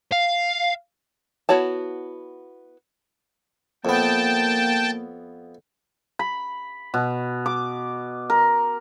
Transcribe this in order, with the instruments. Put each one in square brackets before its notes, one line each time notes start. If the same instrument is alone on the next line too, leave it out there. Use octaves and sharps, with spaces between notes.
[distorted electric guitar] F5
[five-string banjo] B3 E4 F#4 C#5 A5
[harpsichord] F2 B3 [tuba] A#3 [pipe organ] G5 A5
[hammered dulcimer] B5
B2
D6
A#4